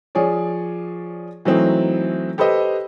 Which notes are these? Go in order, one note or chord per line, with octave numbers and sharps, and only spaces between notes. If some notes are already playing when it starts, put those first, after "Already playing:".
F3 G#4 C#5 D5
E3 F#3 A3 C4 D#4
G4 A4 B4 C5 D#5